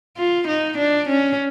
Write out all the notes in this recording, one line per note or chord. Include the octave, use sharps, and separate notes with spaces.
F4
D#4
D4
C#4